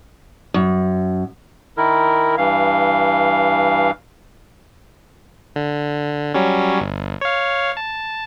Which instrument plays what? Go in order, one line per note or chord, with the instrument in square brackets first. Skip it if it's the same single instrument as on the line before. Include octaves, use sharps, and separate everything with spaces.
[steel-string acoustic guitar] F#2
[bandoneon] D#3 E4 A#4
G2 E3 F5
[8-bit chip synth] D3
F#3 G3 C#4
G1
C#5 F5
A5